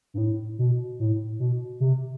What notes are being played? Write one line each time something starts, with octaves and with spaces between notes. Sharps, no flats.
G2
A2
B2
A2
B2
C3